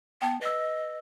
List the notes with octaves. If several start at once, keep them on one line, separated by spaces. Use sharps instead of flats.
B3 G5 A5
B4 D#5 E6